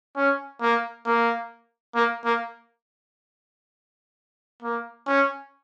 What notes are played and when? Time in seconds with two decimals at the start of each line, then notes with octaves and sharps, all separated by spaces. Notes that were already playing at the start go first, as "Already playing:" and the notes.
0.16 C#4
0.61 A#3
1.06 A#3
1.95 A#3
2.25 A#3
4.63 A#3
5.07 C#4